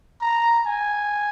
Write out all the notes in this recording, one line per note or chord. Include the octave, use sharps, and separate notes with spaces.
A#5
G#5